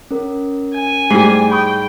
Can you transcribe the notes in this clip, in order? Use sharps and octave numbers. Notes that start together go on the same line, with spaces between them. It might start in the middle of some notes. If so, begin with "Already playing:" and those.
C#4 A#4
G#5
G#2 G3 A3 E4 C7
G5 B5 C#6 D#6